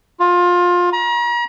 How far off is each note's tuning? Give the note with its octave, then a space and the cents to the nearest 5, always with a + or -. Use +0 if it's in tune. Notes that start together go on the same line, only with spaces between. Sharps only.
F4 +20
A#5 +40